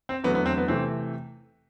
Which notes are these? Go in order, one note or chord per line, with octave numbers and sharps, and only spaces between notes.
C4
E2 D3 F#3 A3 B3
B3
C4
B3
C3 E3 A3 C4